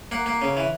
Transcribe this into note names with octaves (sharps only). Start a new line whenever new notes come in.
A#3 F#5
A#3
C#3
E3